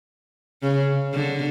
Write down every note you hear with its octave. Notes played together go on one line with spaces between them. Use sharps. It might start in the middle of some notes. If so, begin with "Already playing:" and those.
C#3
D3